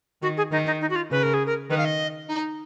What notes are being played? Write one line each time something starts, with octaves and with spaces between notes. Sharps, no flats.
D#3 F#4
G#4
D#3 D#4
D#4
D#4
F#4
F4
C#3 B4
A#4
G#4
A#4
D#3 B4
F5
D#5
D#4